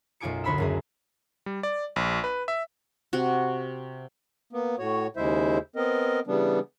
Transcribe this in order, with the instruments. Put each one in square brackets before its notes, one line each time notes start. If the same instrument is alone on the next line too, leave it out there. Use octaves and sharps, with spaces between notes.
[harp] B1 F#2 F4 G#5 D6 C#7
D2 C#5 B5 C6 E6
F#1 F#2 G#4
[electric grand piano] G3
D5
A#1
B4
E5
[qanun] C3 F#4
[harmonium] A#3 B3
A2 F#4 C#5
D#2 C#3 G#3 E4 C5 E5
B3 C4 A#4 D#5
C#3 E3 G3 B3 D4